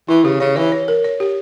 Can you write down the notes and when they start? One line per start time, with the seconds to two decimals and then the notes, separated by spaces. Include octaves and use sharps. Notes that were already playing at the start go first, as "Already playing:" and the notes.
0.09 E3 E4
0.25 C#3 G4
0.40 C#3 C#5
0.56 E3 C#5
0.72 C#5
0.88 A#4
1.04 C#5
1.20 G4